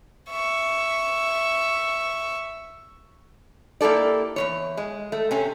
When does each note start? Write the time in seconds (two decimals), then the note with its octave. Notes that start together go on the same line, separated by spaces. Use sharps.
0.30 E5 C#6
3.81 A#3 E4 G4 A4 D5
4.36 E2 C3 C#5
4.77 G#3
5.12 A3
5.31 C3 C#4